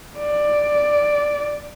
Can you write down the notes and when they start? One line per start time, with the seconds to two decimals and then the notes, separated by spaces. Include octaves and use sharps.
0.19 D5